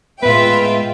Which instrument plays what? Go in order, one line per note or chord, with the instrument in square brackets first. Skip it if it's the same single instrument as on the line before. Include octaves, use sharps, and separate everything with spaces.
[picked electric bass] A2 B3 [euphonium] G#3 [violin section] F4 E5 G5 [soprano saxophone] B4